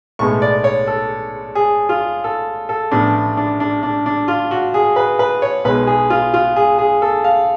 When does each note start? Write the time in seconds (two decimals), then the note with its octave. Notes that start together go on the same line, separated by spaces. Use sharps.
0.19 B1 A2 G#3 B3 C#6
0.42 D5
0.64 C#5
0.87 A4
1.55 G#4
1.89 F4
2.24 A4
2.69 A4
2.91 A1 A2 F3 B3 D4
3.37 D4
3.60 D4
3.83 D4
4.06 D4
4.28 F4
4.51 F#4
4.74 G#4
4.96 B4
5.19 B4
5.42 C#5
5.65 B1 B2 G#3 B4
5.87 G#4
6.10 F4
6.34 F4
6.56 G#4
6.78 G#4
7.02 A4
7.24 F5